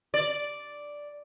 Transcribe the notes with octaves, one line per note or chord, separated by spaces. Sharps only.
D5